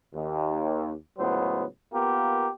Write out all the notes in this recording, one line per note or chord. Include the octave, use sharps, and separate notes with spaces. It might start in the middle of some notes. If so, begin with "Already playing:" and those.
D#2
C#2 A2 F#3 B3 C5
A#3 B3 F4 G4 A#4